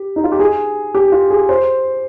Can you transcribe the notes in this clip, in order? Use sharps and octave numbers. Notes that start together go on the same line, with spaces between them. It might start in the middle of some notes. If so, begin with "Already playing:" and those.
Already playing: G4
D#4
F4
G4
G#4
G4
F4
G#4
C5